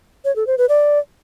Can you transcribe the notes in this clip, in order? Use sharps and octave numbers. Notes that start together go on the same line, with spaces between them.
C#5
A4
C5
B4
D5